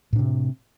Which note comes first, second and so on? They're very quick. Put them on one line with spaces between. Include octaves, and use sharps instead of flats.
A2 D4 C3